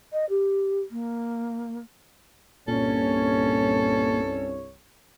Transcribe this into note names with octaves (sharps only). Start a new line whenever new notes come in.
D#5
G4
A#3
C2 G2 A#2 C#4 A4 C#5